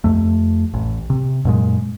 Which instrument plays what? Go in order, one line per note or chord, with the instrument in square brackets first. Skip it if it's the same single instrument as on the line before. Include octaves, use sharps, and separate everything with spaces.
[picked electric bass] F2 A3
A1
C3
F#2 A#2 G#3